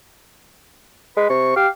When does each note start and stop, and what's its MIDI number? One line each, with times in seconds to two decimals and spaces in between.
1.17 1.29 56
1.17 1.28 71
1.30 1.55 48
1.30 1.53 85
1.56 1.68 67
1.56 1.68 77